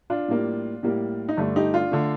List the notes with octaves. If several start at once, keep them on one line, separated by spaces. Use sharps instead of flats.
D4 F4
A2 G3 A#3
A2 G3 A#3
D#4
G2 D3 A3 D4
D#4 G4
D4 F4
D3 A3